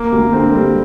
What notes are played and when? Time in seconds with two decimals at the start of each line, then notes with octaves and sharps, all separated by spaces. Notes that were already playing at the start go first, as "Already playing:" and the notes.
Already playing: A#3
0.12 D2
0.33 D3 C4
0.54 G3